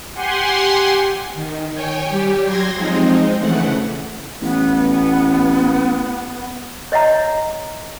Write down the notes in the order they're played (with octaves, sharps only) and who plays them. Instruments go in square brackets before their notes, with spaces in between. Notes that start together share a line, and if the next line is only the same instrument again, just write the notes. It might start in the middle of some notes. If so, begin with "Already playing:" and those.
[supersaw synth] G4 F#5 G#5 C6
[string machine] D#3
C#5 G5 G#5
G3 G4
F#3 C6 G#6 A#6
F3 G#3 C4 D#4
C#3 E3 A3 F#5
[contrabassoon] A1 [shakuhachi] B3
[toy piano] C#5 D#5 E5 F#5 A#5